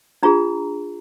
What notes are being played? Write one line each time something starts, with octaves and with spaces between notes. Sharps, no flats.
D4 F4 G#4 A#5